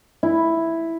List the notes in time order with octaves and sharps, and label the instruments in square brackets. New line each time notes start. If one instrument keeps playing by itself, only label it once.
[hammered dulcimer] E4